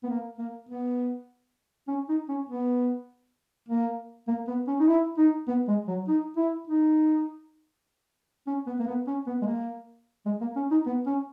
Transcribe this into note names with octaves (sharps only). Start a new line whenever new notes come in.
B3
A#3
A#3
B3
C#4
D#4
C#4
B3
A#3
A#3
B3
C#4
D#4
E4
D#4
B3
G#3
F#3
D#4
E4
D#4
C#4
B3
A#3
B3
C#4
B3
G#3
A#3
G#3
A#3
C#4
D#4
B3
C#4